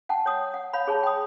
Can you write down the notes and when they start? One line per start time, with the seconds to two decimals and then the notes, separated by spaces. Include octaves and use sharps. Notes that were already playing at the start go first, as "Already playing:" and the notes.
0.09 F#5 G5 A5
0.26 C#5 D#6
0.54 F#5
0.73 C#5 F5 B5
0.87 G#4 C#5 A5 B5
1.03 G5 D#6